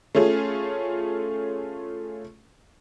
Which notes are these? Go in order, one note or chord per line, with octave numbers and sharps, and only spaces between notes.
A3 C#4 F4 G#4